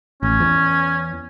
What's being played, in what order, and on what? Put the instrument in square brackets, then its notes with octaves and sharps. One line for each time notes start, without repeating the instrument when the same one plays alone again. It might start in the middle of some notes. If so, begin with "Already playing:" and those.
[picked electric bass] A1 [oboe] C#4
[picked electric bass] E2